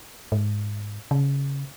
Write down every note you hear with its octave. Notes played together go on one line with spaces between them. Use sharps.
G#2
C#3